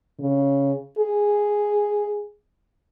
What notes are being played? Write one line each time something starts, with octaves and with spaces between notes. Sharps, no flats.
C#3
G#4